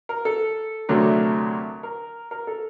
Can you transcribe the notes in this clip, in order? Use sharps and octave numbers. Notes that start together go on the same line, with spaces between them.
A#4
A4
D2 C3 F#3 A3 D4 A#4
A#4
A#4
A4